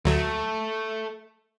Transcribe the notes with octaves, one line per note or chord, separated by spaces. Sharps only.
D2 F#3 A3